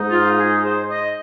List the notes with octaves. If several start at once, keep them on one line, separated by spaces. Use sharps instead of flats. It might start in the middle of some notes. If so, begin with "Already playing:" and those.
Already playing: G#2 G#3 D#4
F4
G#4
C5
D#5